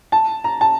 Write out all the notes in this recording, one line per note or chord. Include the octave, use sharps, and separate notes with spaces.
A5
A#5
A5